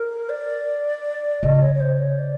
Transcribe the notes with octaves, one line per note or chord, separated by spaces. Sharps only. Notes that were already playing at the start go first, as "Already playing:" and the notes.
Already playing: A#4
D5
C#3 D#5
C#5
C#5
C5
C#5
D5